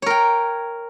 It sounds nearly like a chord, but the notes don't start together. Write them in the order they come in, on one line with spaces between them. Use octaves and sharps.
C#5 A#4 G5